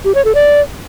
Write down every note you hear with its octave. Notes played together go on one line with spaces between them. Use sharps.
G4
C#5
A4
D5